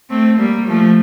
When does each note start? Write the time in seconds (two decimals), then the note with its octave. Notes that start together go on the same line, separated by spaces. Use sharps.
0.10 A3 C4
0.38 G3 A#3
0.68 F3 A3